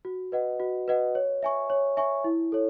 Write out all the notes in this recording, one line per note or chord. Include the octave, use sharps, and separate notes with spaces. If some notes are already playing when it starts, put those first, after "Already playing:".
F#4
B4 D#5 F#5
F#4
B4 D#5 F#5
C#5
E5 G#5 C#6
C#5
E5 G#5 C#6
E4
A4 C#5